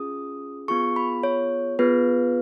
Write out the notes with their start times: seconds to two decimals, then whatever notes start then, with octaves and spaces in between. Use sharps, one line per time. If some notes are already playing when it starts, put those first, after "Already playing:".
Already playing: C#4 F4 G#4 D#6
0.68 B3 F4 G#4 C#6
0.96 B5
1.23 C#5
1.79 B3 F4 G#4 B4